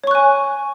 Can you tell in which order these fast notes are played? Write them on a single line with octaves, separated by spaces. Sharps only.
C#5 C#6 F#6 G#5